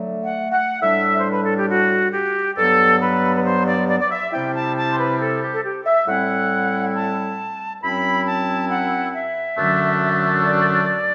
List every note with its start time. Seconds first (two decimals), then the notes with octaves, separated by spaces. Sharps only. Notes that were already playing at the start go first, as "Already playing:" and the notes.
Already playing: D3 F#3 A3
0.23 F#5
0.52 F#5
0.81 A2 G3 D4 E5
1.18 C5
1.31 B4
1.43 A4
1.56 G4
1.69 F#4
2.12 G4
2.56 G2 F#3 B3 A4
3.01 B4
3.36 B4
3.44 C5
3.66 D5
3.88 D5
4.00 D5
4.10 E5
4.32 C3 G3 C4 E4 G5
4.54 A5
4.76 A5
4.90 C5
4.98 B4
5.20 A4
5.41 G4
5.53 A4
5.64 G4
5.85 E5
6.07 A2 G3 C4 E4 F#5
6.95 A5
7.82 F#2 F#3 C4 E4 B5
8.26 A5
8.70 F#5
9.14 E5
9.57 F#2 D3 F#3 A3 D4
10.45 D5